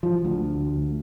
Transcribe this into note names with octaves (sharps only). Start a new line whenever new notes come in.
F3
D2